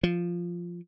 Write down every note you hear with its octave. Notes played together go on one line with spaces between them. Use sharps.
F3